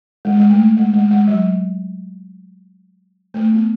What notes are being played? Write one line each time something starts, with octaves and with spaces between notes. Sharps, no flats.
G#3
G#3
A3
G#3
G#3
G#3
F#3
A3
B3